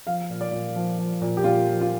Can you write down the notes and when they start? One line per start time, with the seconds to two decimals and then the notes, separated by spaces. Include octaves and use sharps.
0.07 F3 F5
0.30 A#2
0.41 D5
0.52 A#2
0.76 F3
0.98 F3
1.21 A#2
1.37 G4
1.44 A#2 F4
1.67 F3
1.81 F4